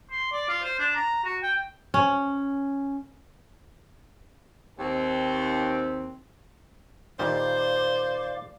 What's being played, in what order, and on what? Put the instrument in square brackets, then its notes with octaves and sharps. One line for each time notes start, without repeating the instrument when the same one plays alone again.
[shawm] C6
D5
F4
C5
D4
A#5
F#4
G5
[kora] C#4
[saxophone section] D#2 C4
[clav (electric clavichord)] A#2 D#3 G3 [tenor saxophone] C5 [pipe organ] D5 F5 D6